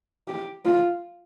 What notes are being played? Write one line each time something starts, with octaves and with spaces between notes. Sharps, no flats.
G4
F4